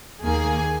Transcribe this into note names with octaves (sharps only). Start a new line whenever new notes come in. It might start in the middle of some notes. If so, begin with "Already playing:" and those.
D#2 D#3 A#3 G#4 G#5